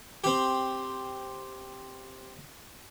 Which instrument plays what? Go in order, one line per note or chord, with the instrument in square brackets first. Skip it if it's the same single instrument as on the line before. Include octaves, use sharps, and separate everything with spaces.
[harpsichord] C4 G4